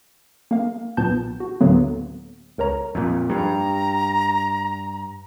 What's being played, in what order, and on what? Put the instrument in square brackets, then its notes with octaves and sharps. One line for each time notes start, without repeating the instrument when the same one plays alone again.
[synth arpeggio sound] A#3 F5
B1 A#2 B3 A5 G6
F#4
D2 A2 D3 F#3 A#3 B3
C#2 A#4 C#5 A#5
[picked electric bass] F2 A#2
[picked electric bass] G2 [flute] A#5